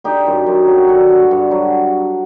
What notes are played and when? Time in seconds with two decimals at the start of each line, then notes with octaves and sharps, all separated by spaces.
0.04 D3 D#4 G4
0.26 F#2
0.46 F#2
0.67 F#3
0.88 D3 F#4 A4
1.10 G2
1.31 G2
1.51 F#3